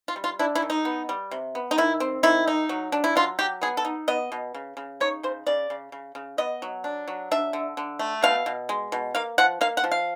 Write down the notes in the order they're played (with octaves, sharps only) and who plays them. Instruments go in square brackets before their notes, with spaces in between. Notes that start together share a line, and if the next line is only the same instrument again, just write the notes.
[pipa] F4
G3
F4
D4 E4
E4
D#3
D#4
B3
G3
C3
B3
D#4
D#3 E4
C4
D#3 E4
D#4
F#3
D4
E4
F#3 F4
F#3 G4
B3 G#4
A4
D#4
B3 D#5
B2
C#3
C#3
D#4 C#5
C#3 C5
C#3 D5
C#3
C#3
C#3
B3 D#5
F#3
D4
F#3
D4 E5
D3
D3
A3
B2 F5
B2
G#3
B2
A#3 F5
F3 F#5
A#3 F5
F#5
F3
F5